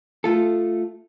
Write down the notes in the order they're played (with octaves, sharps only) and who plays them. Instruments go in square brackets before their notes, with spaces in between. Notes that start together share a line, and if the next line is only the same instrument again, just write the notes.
[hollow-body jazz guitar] A3 F4 A4